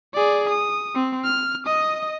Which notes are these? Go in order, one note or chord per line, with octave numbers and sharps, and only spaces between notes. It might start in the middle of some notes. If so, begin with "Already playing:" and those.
G#4 D5
D#6
C4
F6
D#5 D#6